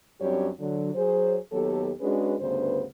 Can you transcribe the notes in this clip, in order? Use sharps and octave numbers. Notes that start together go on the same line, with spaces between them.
F#2 G3 C4 D4 G4 C#5
D3 F#3
F#3 G#4 C5
D#2 F#3 B3 G4 A4
G#3 C#4 D4 F#4 G#4 B4
D2 G2 C#3 B3 B4 C5